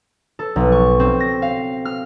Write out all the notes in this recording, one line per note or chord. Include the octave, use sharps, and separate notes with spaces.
A4
B1
C#6
C4
A#6
F5
F6